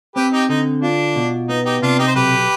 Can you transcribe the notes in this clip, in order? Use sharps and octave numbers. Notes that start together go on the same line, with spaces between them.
C4 G4 B4
D#4 G4
D3 D#4
D4 F4
B2
B3 D#4
D#4 G4
C3 D4 F4
D#4 G4
C5
B1 G4 B4